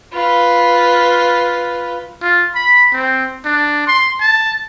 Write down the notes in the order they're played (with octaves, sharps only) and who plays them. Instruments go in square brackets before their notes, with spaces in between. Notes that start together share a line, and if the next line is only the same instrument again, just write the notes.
[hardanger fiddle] F4 B4
[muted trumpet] F4
B5
C4
D4
C6
A5